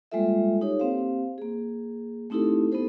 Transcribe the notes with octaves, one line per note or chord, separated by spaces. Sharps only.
G3 G#3 A#3 F4 A4 E5
D#4 G4 A4 C#5
A#3 C4 G4 C5 F5
A#3 G#4
A3 C4 D#4 E4 G4 A4
B3 D#4 G4 A4 C5